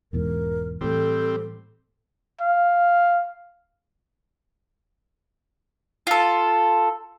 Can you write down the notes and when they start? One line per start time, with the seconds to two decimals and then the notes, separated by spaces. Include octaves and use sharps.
0.13 E1 E2 G#2 A#4
0.81 A2 E3 G3 C4 A4
2.41 F5
6.07 F4 A4